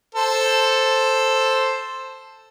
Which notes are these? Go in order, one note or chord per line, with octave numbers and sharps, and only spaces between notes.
A4 C5